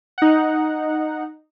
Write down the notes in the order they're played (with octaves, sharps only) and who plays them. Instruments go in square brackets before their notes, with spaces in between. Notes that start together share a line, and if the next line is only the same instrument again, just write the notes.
[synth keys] D#4 F#5